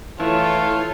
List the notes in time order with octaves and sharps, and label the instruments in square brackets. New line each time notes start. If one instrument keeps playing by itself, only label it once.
[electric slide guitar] E3 [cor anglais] A3 [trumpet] F4 [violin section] A4 C#5